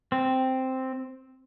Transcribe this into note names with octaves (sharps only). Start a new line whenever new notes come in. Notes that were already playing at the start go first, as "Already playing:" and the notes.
C4